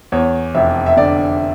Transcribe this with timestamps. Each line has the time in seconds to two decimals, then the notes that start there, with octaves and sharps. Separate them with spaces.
0.12 E2 C#5
0.54 F1 E5
0.86 E5
0.97 D3 D5